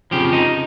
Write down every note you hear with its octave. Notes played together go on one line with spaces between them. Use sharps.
F2 C#3 F3 G4
D#4